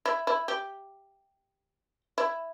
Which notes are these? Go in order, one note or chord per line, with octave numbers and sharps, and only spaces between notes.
E4
E4
G4
E4